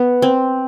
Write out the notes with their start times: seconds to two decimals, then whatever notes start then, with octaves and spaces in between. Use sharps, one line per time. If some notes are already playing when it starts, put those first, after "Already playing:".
Already playing: B3
0.22 C4